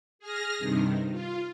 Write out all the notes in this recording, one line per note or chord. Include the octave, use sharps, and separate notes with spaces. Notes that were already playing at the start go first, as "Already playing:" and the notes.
G#4 F6 A#6
G2 C3 D#3
F4